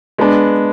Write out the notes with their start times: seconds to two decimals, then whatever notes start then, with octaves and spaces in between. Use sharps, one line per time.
0.18 G#3 B3 D4